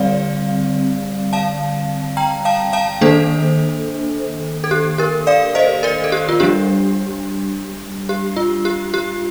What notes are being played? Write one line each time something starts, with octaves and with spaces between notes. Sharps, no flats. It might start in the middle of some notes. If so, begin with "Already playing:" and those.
Already playing: D3 G3 C4 D5 F5
F5 A5
G5 A#5
F5 A5
F5 A5
D#3 A#3 D4 A4 C5
A4
G4
G4 A#4
D5 F5
C5 D#5
A#4 D5
A4
G4
F4
G3 D4 G4
G4
F4
G4
G4